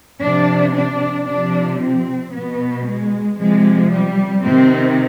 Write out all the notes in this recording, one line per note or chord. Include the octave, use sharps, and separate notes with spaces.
C3 F3 D4
D4
C3 F3 D4
C4
B2 B3
G#3
C3 F3 G#3
G3
C3 D#3 C4